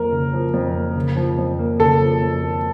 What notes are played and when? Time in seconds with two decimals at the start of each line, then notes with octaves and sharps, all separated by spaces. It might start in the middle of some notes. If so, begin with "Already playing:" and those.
Already playing: F2 F3 A#3 A#4
0.12 C#3
0.33 F3
0.54 F2
0.75 A#3
0.96 C#3
1.16 F3
1.38 F2
1.59 A#3
1.80 C#3 A4
2.00 F3
2.21 F2
2.43 A#3